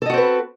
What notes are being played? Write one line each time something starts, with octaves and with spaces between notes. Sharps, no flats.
C4 F#4 A4 B4 D#5